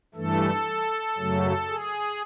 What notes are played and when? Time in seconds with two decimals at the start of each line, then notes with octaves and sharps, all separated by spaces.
0.15 G2 E3 A3 A4
1.18 F#2 C#3 F#3 A3
1.69 G#4